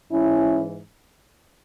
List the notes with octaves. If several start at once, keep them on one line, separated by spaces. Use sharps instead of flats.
G#2 E3 C#4 E4